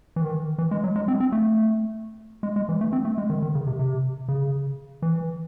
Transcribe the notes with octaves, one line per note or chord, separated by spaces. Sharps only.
E3
D#3
E3
G#3
F#3
G#3
C4
C4
A3
G#3
G#3
E3
A3
C4
A3
G#3
D#3
D#3
C#3
C3
C3
C#3
E3